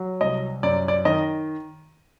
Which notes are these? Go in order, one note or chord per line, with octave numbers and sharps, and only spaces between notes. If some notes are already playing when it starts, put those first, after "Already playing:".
Already playing: F#3
C2 D#5
F#2 D5
D5
D#3 D#5